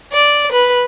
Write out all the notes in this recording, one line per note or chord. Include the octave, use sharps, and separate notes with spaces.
D5
B4